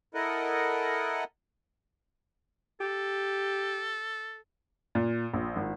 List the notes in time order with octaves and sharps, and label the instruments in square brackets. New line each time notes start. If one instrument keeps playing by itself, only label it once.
[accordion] E4 A4 A#4 D#5 F#5
[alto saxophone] G4 [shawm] A4
[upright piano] A#2
A#1
G#1